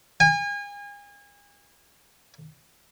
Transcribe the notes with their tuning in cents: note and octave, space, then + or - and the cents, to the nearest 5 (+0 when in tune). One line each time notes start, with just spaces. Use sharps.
G#5 -35